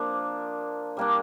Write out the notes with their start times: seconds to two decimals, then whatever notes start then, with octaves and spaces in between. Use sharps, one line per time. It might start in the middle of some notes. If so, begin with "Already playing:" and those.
Already playing: F3 A#3 D4
0.97 G3 A#3 D4